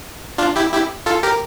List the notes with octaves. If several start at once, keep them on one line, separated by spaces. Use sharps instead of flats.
D4 F4
E4 G4
E4 G4
F4 A4
G4 A#4